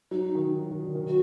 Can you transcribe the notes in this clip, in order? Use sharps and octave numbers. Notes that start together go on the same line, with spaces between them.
F#3 D#4
D#3
F#3
D#3
D3
D#3
F#3 F#4